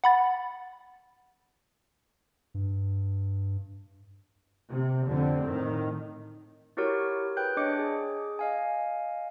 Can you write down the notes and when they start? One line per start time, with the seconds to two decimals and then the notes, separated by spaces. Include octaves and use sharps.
0.04 F#5 B5 A6
2.54 G2
4.69 C3
5.07 F2 D3 C4
5.44 A2 D#3
6.77 E4 F#4 G4 A#4 C#5
7.37 G#4 B4 G5 F#6 G6
7.57 D4 C#5 D#5 D6 C#7
7.79 G#4
8.39 D#5 F5 G#5